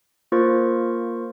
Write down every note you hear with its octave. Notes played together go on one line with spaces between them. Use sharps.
A#3 F4 A#4 C5 C#6 A6